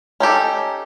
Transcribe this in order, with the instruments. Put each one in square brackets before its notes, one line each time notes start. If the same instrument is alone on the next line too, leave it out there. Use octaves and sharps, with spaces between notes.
[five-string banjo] C#4 D#4 G4 A4